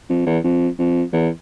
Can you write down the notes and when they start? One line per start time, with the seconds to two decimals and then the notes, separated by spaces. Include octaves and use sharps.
0.10 F2
0.26 E2
0.44 F2
0.78 F2
1.13 E2